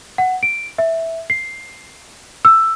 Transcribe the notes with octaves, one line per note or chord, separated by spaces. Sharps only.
F#5
D7
E5
C7
E6